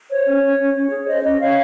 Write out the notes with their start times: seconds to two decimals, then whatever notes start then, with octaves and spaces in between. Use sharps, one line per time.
0.09 C5 C#5
0.26 C#4
0.42 C#4
0.58 C#4
0.74 C#4
0.91 G#4
1.07 C5 D#5
1.23 C#4 D#5
1.40 C#4 C#5 F5